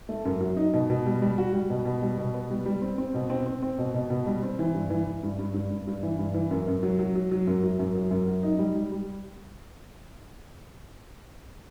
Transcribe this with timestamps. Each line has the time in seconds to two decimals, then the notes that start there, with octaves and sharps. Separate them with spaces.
0.09 A3
0.25 F#2
0.41 F#3
0.57 D#4
0.74 B2
0.90 B2
1.06 G3
1.22 G3
1.38 F#4
1.53 G3
1.70 B2
1.85 B2
2.02 G3
2.18 B2
2.34 B3
2.50 G3
2.66 G3
2.82 C4
2.98 C4
3.14 B2
3.30 C4
3.46 C4
3.62 C4
3.78 B2
3.94 B2
4.10 B2
4.26 G3
4.43 C4
4.59 E3
4.74 G2
4.90 E3
5.06 E3
5.23 G2
5.39 G2
5.54 G2
5.71 G2
5.87 G2
6.03 E3
6.19 G2
6.34 E3
6.51 F#2
6.68 F#2
6.83 F#3
6.99 F#3
7.15 F#3
7.31 F#3
7.47 F#2
7.63 F#3
7.79 F#2
7.95 F#3
8.11 F#2
8.27 F#3
8.43 D#4
8.59 G3
8.75 G3
8.92 G3